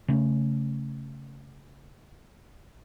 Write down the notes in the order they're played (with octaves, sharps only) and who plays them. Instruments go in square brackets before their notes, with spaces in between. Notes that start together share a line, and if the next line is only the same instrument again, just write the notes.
[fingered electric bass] C#3 A3 C#4